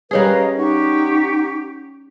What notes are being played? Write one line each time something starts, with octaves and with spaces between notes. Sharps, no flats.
G3 C#4 G#4 A#4 B4 D#5 F5
D#4 G4 F#5 C#6